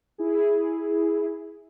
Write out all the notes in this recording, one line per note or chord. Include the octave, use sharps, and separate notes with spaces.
E4 G#4